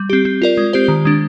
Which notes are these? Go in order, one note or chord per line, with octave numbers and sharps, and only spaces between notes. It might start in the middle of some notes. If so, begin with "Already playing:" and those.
Already playing: G3
C4 G4
C4
F4 A#4 D5
G#3
C4 G4 C5
D#3
G#3 D4